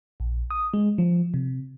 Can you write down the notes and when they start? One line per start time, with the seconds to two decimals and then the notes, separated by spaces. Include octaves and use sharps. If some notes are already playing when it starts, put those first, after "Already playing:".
0.20 A#1
0.50 D#6
0.74 G#3
0.98 F3
1.34 C3